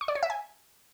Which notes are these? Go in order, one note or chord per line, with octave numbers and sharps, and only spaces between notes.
C#6
D5
C#5
E5
G#5